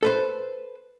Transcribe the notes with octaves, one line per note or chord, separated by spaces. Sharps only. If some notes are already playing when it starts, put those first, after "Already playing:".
A4 B4 C5